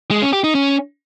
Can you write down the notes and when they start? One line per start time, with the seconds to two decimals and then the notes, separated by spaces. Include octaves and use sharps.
0.11 G#3
0.22 C#4
0.33 G4
0.44 D#4
0.55 C#4